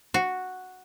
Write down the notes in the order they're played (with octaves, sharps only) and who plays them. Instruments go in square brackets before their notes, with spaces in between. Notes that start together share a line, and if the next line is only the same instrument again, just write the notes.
[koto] F#4